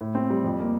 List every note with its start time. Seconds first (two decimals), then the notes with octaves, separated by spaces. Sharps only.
0.01 A2
0.15 C4
0.30 G3
0.44 F2
0.60 A#3